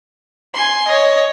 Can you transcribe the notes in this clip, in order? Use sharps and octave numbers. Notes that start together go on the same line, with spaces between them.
G#5 C6
C#5 D#5